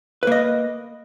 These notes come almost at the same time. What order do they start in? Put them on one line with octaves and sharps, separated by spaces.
B4 A#3 D#5